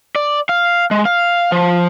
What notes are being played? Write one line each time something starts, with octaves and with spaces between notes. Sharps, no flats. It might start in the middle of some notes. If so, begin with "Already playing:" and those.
D5
F5
G#3
F5
F3